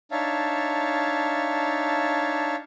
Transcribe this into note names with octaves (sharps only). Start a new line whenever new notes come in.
D4 D#4 C#5 E5 F5 A5